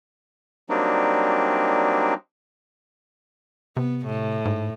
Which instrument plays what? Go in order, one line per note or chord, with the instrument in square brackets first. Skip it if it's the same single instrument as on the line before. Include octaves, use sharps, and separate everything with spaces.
[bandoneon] F#3 G3 A#3 C4 D4 D#4
[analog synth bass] C3 [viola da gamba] B3
[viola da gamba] A2
[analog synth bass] G#2